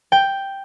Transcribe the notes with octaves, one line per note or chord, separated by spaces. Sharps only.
G5